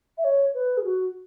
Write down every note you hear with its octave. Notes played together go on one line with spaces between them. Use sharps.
E5
C#5
B4
G#4
F#4